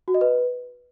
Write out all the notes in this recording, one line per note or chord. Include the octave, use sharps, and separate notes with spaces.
F#4
D#5
B4